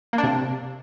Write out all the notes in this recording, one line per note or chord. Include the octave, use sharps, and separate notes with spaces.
A#3
D4
C3